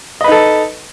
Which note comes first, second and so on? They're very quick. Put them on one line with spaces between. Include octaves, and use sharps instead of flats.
D#5 B4 D#4 A4